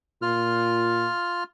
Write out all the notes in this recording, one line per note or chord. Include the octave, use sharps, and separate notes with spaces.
A#2 F4 F6